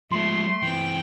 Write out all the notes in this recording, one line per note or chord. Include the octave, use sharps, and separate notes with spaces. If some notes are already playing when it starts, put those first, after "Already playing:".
F3 G#3 A3 C6
E3 C4 G5